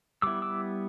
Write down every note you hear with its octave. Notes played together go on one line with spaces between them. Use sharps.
G3 B3 E4 D6 E6
D6 E6